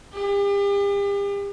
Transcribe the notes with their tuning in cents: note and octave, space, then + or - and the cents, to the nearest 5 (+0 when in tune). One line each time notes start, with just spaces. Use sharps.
G4 +40